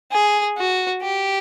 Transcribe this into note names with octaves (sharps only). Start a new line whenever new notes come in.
G#4
F#4
G4